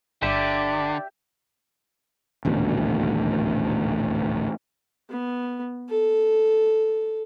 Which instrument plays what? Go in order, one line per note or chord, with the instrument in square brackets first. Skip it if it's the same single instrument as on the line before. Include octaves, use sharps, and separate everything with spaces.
[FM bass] G1 [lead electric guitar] D3 [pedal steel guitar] G4 E5 [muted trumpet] D5
[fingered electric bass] D#1 A1 D2 B2
[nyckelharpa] B3
A4